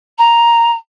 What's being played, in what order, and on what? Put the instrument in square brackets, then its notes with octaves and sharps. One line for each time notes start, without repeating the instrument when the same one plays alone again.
[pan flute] A#5